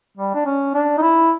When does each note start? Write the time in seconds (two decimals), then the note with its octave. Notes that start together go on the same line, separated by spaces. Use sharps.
0.17 G3
0.34 D4
0.46 C#4
0.74 D4
0.97 D#4
1.02 E4